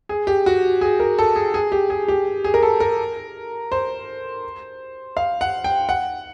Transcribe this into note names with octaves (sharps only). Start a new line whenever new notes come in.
G#4
G4
F#4
G#4
A#4
A4
G#4
G#4
G4
G#4
G4
G#4
A#4
A4
A#4
C5
F5
F#5
G5
F#5